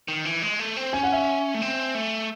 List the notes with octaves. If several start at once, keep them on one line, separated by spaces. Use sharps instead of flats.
D#3
E3
G#3
A3
C4
C#4 G#5
F#5
E5 G#5
A3
C4
A3